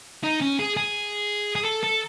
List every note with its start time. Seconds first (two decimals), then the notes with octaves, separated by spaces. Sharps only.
0.24 D#4
0.41 C#4
0.59 G#4
0.77 G#4
1.56 G#4
1.65 A4
1.83 A4